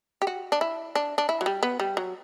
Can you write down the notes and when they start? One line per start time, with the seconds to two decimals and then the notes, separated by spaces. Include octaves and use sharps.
0.22 G4
0.27 F#4
0.52 D4
0.61 E4
0.95 D4
1.18 D4
1.29 E4
1.41 F#3
1.46 G3
1.63 B3
1.80 G3
1.97 F#3